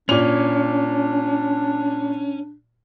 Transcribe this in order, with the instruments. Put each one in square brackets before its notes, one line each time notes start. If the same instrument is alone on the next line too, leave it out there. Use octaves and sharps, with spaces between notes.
[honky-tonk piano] A#2 F7 [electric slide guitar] C#4 [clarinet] D4